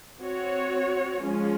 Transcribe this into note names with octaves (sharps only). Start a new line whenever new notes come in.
C4 F#4 C#5
F3 G#3 C#4 F4